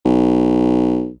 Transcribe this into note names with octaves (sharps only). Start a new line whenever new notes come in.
B1